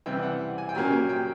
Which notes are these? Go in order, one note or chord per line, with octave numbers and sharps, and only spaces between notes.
C3 E3 G3 C4 G5
F#5
G#5
G5
A#2 F#3 A#3 C#4 G#5
G5
G5